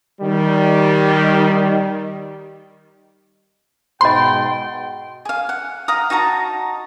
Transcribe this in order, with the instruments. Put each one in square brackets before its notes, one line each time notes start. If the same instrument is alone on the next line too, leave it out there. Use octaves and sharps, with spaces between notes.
[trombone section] D#3 G3
[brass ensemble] G#2 B2 G5 [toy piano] D#5 B5 [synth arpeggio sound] C6
[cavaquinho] G#4 F5
F#5
F5 A#5 D#6
D#4 F#4 A5 A#5